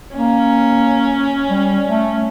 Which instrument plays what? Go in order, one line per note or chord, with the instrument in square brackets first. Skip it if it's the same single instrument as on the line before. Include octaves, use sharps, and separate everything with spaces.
[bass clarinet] A#3 [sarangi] C#4
[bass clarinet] G3
A3